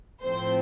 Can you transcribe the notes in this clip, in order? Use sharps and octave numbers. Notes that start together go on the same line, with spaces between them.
A2 F3 A3 C4 C5